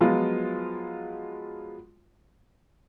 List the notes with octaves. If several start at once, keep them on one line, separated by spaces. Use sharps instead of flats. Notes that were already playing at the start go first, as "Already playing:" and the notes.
F3 F#3 G#3 B3 F4